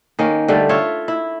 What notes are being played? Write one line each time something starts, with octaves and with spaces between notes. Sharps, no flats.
D#3 A#3 C#4
D3 G3 A3
F4 C#5 E5
E4